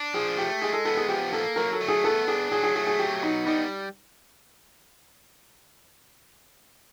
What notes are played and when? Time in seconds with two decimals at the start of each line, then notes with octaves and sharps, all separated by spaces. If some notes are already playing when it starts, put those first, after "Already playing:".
Already playing: D4
0.14 F3 G#4
0.38 A3 G4
0.62 G#3 G#4
0.73 A4
0.85 B3 A4
0.97 G#4
1.08 F3 G4
1.33 A#3 A4
1.56 F#3 A#4
1.72 A4
1.81 A3
1.88 G#4
2.04 B3 A4
2.27 D4 G#4
2.51 F#3 G#4
2.63 G#4
2.75 A3 G#4
2.87 G#4
2.99 F#3 G4
3.23 B3 D#4
3.47 G3 D#4